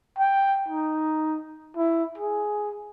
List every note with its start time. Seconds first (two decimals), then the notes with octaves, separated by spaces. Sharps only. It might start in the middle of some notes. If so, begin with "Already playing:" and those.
0.18 G5
0.68 D#4
1.77 E4
2.18 G#4